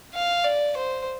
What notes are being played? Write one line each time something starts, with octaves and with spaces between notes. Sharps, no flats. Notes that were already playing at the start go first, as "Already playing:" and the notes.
F5
D5
C5